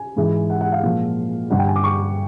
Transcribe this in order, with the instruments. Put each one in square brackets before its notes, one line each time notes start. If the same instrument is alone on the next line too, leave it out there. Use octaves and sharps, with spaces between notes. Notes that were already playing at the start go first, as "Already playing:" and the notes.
Already playing: [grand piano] G#5
G#2 E3 G#3
F#5
F#5
F5
A#2 F3 G#3
G2 D3 G3 F#5
G5
G#5
D6
C#6